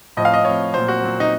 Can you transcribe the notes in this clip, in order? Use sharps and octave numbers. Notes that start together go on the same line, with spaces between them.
A2 F3 D#5
F5
D#5
A2 F3 C#5
A#2 F#3 C5
F#4
A#2 F#3
D#4